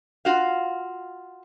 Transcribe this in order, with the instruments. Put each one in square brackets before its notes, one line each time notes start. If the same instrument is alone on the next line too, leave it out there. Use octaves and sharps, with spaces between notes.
[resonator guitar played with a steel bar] F4 F#4 F5